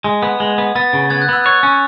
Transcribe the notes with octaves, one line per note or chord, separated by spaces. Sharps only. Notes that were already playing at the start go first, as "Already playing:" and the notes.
G#3
B3
G#3
B3
B3 A6
C#3
B3 G#6
F#6
B3 E6
C#5 F#6
C#4